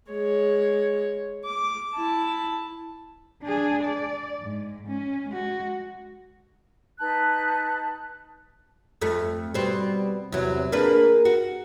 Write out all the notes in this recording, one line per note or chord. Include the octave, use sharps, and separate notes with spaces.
G#3 C#5
D6
E4 A5
D4 G#4
D5
G#2
C#4
G#3 F#4
D#4 B4 A5 F#6
F2 A3
B2 G3 C4
E2 C3 F#3
A#3 D4 G#4 A#4 B4
F#4